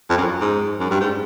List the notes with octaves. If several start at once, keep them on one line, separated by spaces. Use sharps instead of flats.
F2
F#2
G#2
F#2
G2
G#2